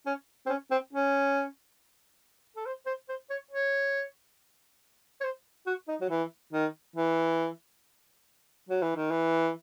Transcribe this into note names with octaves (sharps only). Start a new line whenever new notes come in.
C#4
C4
C#4
C4
C#4
A4
C5
C5
C5
C#5
C#5
C#5
C5
F#4
D#4
F#3
E3
D#3
E3
F#3
E3
D#3
E3